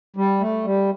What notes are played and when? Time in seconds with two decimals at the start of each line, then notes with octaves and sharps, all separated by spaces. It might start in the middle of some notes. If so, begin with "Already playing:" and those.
0.16 G3
0.40 A3
0.65 G3